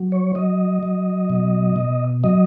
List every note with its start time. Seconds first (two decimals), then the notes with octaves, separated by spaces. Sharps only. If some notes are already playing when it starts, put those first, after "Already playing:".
Already playing: F#3
0.12 C#5
0.35 F#3 D#5
0.83 F#3
1.30 B2
1.76 B2
2.24 F#3 D#5